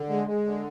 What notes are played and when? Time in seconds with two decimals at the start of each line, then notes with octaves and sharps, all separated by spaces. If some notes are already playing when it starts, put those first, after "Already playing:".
Already playing: D3
0.10 G#3
0.27 G#3
0.46 D3